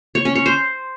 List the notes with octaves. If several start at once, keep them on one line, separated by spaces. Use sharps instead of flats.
C#5
C#4
C#5
C5